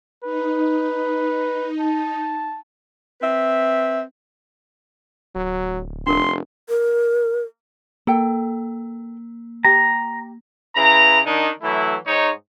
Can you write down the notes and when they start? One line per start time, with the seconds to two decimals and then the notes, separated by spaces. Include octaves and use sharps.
0.24 D#4 B4
1.80 A5
3.21 C4 B4 E5
5.35 D1 F#3
6.06 F1 D4 A#4 C6
6.69 A#4
8.07 A#3 A4 G5
9.65 G4 A#5
10.76 C#3 E4 B4 A#5
11.25 D#3 D4 D#4
11.62 E3 F#3 A3 E4
12.07 G#2 D#4 C#5